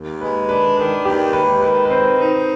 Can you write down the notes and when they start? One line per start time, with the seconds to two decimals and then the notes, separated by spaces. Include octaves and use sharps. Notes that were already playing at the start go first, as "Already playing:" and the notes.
Already playing: D#2
0.21 G#3 B4
0.48 D4 B4
0.77 D#3 B4
1.05 D#2 G4
1.33 G#3 B4
1.62 D#3 B4
1.85 B4
1.89 C4 C5
2.17 D#4